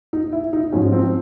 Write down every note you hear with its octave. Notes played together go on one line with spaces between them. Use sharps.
D#4
E4
D#4
G#2 F3 C#4
C4